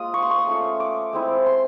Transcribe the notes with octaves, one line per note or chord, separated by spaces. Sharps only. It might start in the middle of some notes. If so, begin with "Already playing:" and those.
Already playing: G#3 A#3 F4 D#6
C#6
C6
C#6
D#6
A3 C#4 F4
D6
G#3 C4 E4
C6